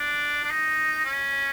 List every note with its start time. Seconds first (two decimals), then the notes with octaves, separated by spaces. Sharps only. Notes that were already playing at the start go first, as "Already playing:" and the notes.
Already playing: D4
0.44 D4
0.50 D#4
1.05 C#4